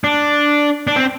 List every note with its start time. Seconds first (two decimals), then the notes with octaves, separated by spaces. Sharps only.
0.04 D4
0.87 D4
0.96 C4